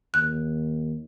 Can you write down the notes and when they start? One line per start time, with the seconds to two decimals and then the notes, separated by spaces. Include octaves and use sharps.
0.14 D#2 F#6